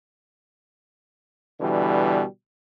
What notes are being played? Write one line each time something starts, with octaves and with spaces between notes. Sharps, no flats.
B2 D3 E3 G3